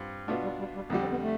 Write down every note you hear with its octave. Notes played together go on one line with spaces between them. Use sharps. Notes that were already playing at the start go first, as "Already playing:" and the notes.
Already playing: G2 C4 F4
B2 A3 B3 D4 F4
G3
G3
G3
F2 D3 G3 A3
C4
B3
A3